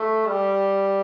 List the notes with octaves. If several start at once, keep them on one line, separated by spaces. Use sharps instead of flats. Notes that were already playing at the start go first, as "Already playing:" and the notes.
Already playing: A3
G3